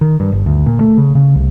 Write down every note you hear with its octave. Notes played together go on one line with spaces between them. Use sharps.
D#3
G2
G1
D2
A#2
A3
C#3
C#3
C2